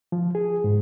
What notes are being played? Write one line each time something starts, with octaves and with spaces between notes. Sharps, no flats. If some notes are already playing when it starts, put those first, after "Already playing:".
F3
G#4
G#2